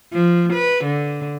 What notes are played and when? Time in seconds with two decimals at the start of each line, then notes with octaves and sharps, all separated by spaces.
0.13 F3
0.53 B4
0.85 D3